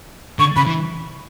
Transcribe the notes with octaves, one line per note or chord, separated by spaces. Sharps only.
D3 C#6
C#3 B5
E3